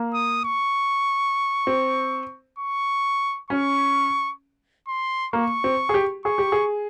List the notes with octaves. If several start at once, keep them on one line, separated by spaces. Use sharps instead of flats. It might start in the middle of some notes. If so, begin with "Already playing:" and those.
Already playing: A#3
D#6
C#6
C4
C#6
C#4 C#6
C6
A#3 C#6
C4
G#4
G4
G#4 C#6
G4
G#4